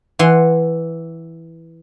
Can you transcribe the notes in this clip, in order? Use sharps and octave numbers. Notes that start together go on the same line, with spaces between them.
E3 F#5 C6